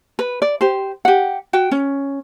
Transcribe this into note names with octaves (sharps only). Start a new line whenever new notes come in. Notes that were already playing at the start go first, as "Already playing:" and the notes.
B4
D5
G4 C5
G4 F#5
F#4 G5
C#4